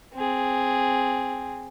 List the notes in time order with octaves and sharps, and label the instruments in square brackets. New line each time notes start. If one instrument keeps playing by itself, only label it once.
[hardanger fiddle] C4 G#4